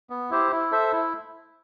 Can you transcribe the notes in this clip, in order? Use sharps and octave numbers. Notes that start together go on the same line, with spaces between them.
B3
E4 G4 C5
E4
A4 C5 E5
E4